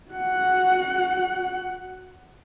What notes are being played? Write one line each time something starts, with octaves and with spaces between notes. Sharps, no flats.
F#4 F#5